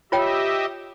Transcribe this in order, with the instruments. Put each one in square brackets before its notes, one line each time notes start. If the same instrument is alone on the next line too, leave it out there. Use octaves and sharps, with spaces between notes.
[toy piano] F4 C#5 G5 [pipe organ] G4 D#5 E5